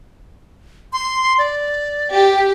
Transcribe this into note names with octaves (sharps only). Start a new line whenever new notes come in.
C6
D5
G4